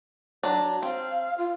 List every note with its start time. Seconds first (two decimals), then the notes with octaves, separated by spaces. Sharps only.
0.43 F#3 D4
0.83 C4 F5
1.38 F4